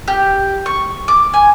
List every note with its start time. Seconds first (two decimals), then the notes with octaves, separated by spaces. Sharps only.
0.08 G4
0.66 C#6
1.08 D6
1.34 G#5